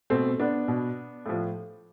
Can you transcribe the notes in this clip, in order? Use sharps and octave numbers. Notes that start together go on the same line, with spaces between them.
B2 A3 C4
B3 D4
B2
A2 F3